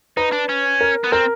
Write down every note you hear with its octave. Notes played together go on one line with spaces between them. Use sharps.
D#4 B4
D4
C#4
A#4
B3
C4 A#4